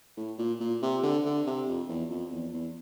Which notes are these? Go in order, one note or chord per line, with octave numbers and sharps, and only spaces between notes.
A2
A#2
A#2
C3
D3
D3
C3
F2
E2
F2
E2
E2